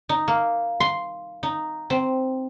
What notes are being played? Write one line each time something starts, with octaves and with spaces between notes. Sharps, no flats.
D#4
A#3
C6
D#4
C4